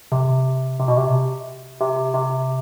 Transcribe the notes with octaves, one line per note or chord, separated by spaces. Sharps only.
C3
C3
B2
C3
C3
C3